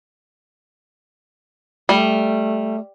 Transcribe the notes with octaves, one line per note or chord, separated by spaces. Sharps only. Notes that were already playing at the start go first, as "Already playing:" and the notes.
G3 A3